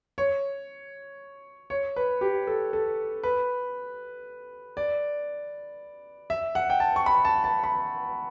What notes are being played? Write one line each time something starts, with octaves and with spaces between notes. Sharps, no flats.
C#5
C#5
B4
G4
A4
A4
B4
D5
E5
F#5
G5
A5
C#6
B5
A5
A5
B5